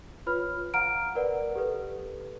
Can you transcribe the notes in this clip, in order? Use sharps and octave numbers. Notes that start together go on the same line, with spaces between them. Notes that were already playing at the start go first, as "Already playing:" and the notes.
F4 B4 C#5 B5 F6
F5 F#5 A#5 F6 D7
A#4 B4 D5 F#5
G4 A4 B4